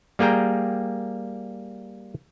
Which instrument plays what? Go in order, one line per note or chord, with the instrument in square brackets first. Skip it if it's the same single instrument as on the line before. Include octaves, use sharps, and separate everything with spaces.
[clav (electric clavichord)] G3 A#3 G#4 G5 A#5